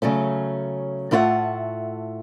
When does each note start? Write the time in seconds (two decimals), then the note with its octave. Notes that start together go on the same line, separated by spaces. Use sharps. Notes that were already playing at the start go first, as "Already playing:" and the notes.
0.02 C#3 F#3 A3 C#4
1.11 A2 A3 E4 F4 E5 F#5